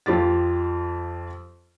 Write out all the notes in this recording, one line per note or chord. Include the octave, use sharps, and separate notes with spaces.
F2 F4 G4 A6